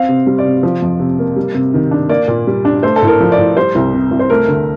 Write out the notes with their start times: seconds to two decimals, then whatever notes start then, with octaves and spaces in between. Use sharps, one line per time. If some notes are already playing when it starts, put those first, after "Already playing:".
Already playing: C4 F5
0.09 C3
0.27 G3
0.39 D5
0.45 C3
0.63 F3
0.82 F2
1.00 C3
1.19 A#3
1.36 G3
1.54 C3
1.74 D#3
1.91 D4
2.09 A#3 D5
2.28 A#2
2.47 G3
2.65 D4
2.83 A3 C5
2.96 A4
3.02 A2
3.08 A#4
3.20 F3
3.32 D5
3.38 A2
3.57 G3 C5
3.75 C2
3.94 C3
4.11 C2
4.19 C5
4.30 A3 A#4
4.48 D2